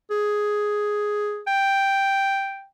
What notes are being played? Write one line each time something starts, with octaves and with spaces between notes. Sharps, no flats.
G#4
G5